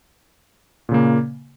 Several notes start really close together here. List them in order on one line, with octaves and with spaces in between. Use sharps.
A#2 C#3 A#3